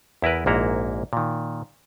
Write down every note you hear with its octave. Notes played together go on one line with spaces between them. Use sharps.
E2 E4 A#4 B4
A#1 G#2 A#3 E4 F#4 A#5
A#2 D#3